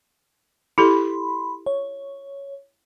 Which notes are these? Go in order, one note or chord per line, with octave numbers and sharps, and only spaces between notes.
E4 G4 A4 B5 C6
C#5